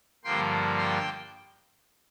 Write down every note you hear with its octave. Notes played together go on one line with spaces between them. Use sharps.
G2 D3 F3 A#3 G5 C6
G5 C6